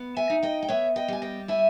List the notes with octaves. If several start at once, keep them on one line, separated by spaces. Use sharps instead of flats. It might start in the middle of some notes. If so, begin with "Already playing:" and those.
Already playing: B3
E5 G#5
D#4
D#5 G5
G5
B3 C#5 E5
D#5 G5
G3 G#5
D#5 G5
E4 E5 G#5